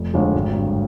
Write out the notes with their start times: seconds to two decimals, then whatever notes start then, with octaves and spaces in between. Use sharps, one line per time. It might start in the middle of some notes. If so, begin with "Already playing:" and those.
Already playing: F1
0.14 D#2 D3 F3 G#3
0.35 G#1
0.55 G2 D3